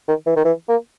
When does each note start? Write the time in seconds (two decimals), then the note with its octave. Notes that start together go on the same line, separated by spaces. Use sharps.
0.08 D#3
0.26 E3
0.36 D#3
0.45 E3
0.69 A#3